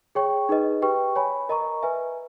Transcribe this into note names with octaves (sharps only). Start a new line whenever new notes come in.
G#4 C#5 G5 C#6
D#4 G#4 B4 D#5
G4 B4 G5 C#6
C#5 G#5 B5
A#4 D#5 A#5 C#6
B4 E5 G#5